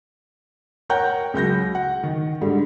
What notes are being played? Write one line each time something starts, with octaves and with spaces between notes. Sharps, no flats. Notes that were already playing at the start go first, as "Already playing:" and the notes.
A#4 C#5 F#5 G5 A#5 G6
C#2 F#3 G6 A#6
F#5
D#3
G#2 D3 G3